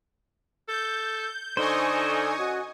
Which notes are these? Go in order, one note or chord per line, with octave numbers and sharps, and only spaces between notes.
A4 G6
D3 D#4 A4 C5 G#5 C#6 D#6
C#4 F#4 D#5